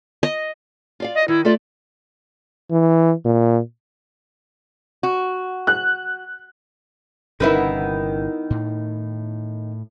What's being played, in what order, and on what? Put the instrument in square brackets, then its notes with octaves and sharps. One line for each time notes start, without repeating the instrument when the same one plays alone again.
[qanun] D#5
[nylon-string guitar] F4 D5 F5
[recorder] D#5
[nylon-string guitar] D#3 [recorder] E4
[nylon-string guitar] A3 A4 D5 [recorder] F4
[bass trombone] E3
A#2
[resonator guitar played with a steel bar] F#4
[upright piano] F#6
[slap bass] G1 C3 C#4 [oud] D#3 B3 E4
[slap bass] A2